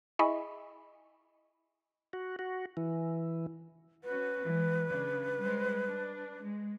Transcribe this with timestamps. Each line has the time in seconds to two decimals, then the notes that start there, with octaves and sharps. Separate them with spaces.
0.19 E4 G#4 D#5 E5 B5 C#6
2.13 F#4
2.39 F#4
2.77 E3
4.04 C#4 F#4 B4
4.44 E3 F#3 G#3
4.86 C#3 D4
5.40 G3 G#3 C5
5.87 D4
6.44 G#3